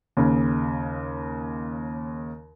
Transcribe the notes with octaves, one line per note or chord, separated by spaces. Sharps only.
D#2 C#3